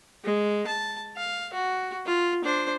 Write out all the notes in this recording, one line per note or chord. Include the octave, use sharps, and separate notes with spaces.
G#3
A5
F5
F#4
F4
D4 C5